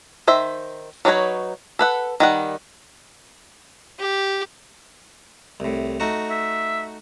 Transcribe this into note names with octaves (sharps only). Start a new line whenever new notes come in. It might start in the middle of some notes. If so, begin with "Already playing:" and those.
D#3 C5 E5
F#3 D4 D#4 B4 C#5
A4 B4 F#5
D#3 G3 F#5
G4
C2 A2
A3 D#4 F#4
E5